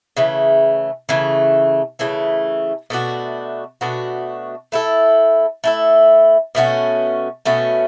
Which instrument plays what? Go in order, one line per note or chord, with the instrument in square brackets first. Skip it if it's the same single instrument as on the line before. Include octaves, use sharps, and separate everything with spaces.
[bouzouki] C#3 E3 A3
C#3 E3 A3
C#3 E3 A3
B2 A3 D4 F#4
B2 A3 D4 F#4
A3 E4 A4
A3 E4 A4
B2 A3 C#4 F#4
B2 A3 C#4 F#4